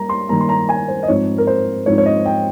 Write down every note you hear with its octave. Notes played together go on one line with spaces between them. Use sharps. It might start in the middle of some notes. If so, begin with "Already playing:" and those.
Already playing: G3 A#3 A#5
C6
D#3 G3 A#3 A#5
C6
A#5
G#5
C5
D#5
G#2 F3 C4 D#4 C#5
A#4
C5
G#2 F3 C4 D#4 C#5
C#5
D#5
G5